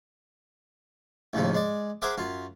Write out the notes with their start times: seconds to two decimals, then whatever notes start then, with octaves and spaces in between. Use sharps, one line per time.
1.33 A1 D#2 C#3 F3
1.55 G#3 D5
2.02 G#4 A#4 C5 E5 F#5 D6
2.18 F#2 F4